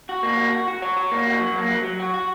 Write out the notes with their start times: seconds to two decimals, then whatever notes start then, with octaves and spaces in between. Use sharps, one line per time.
0.09 F#4
0.23 A#3
0.37 F#4
0.52 F#4
0.68 F#4
0.82 C#5
0.97 F#4
1.12 A#3
1.27 F#4
1.41 F#3
1.56 A#3
1.70 F#3
1.84 F#3
2.00 F#4
2.14 F#4